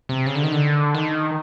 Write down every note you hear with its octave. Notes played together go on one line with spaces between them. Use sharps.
C3
C#3
D3
D#3
D3
D#3